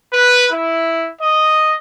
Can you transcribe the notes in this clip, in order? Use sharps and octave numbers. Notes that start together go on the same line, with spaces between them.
B4
E4
D#5